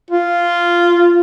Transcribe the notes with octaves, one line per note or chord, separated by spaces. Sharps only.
F4